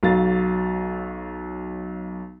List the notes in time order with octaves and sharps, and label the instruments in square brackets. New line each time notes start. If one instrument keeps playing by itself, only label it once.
[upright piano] B1 F#3 F5 A6